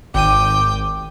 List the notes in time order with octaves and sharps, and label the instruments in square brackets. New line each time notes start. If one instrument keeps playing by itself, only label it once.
[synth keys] G#1 D#7 [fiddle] G5 [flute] D6